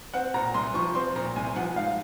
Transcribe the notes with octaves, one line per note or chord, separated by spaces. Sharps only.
C4 F#5
A#2 A#5
C2 C6
F3 C#6
C4 C6
A#2 A#5
C2 G#5
F3 F#5
G#2 F5